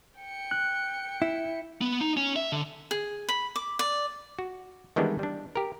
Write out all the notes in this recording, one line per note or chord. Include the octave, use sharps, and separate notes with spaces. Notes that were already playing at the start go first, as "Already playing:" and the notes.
G5 C#7
F#6
E4
B3
D#4
C#4
E5
D3
G#4
B5
D6
D5
F#4
D#3 E3 G3 G#3 B3 D4
G3 D4
G4 A#4